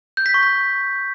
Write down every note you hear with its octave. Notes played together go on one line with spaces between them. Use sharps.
G6
B6
C#6
B6